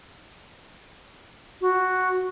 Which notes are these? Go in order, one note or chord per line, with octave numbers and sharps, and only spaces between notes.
F#4